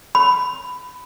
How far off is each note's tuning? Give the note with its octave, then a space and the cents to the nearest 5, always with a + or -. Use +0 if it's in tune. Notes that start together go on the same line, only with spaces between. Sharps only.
B5 +15